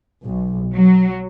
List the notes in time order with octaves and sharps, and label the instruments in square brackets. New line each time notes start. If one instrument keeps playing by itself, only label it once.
[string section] B1
F#3